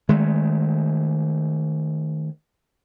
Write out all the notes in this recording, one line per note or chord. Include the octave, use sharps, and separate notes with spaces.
D#3 G#3 A3